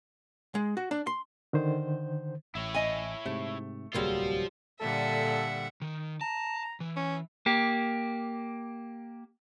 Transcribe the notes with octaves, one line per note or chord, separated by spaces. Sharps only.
G#3
F#4
D4
C6
D3 D#3 C5
A1 E4 C#5
D#5 G#5
G#2 C3 A3
D1 C2 F#3 G3 A#3 F4 C5
A#2 D3 G3 A4 E5 F#5
D#3
A5 A#5
E3
C#4
A#3 G4